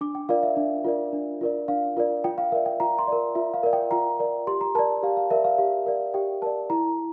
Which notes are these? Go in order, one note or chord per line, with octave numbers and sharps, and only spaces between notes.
D4 D6
G5
F4 A#4 D5 F5
E5
D4 E5
F4 A#4 D5
D4
F4 A#4 D5
D4 F5
F4 A#4 D5
F4 G5
F5
A#4 D5 E5
G5
F4 A#5
C6
A#4 D5
F4 E5
F5
A#4 D5
G5
F4 A#5
A#4 D5
G4 C6
A#5
A#4 D5 A5
G4 F5
F5
A#4 D5 E5
F5
G4 F5
A#4 D5
G4 G5
A#4 D5 A5
E4 A#5